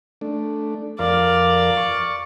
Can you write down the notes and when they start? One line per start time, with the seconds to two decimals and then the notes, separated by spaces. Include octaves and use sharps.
0.21 A3 D4
0.99 F2 A#4 D5 F5
1.77 C#6